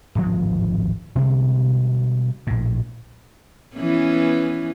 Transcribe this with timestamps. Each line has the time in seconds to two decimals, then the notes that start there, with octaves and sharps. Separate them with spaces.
0.15 D1 G#1 F#2 F3
1.15 B2 D3 G3 G#3
2.47 A#1 A2
3.76 E3 B3 C#4